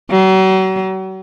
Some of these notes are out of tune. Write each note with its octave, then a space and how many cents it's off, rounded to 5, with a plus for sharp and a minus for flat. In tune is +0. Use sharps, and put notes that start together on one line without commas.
F#3 +40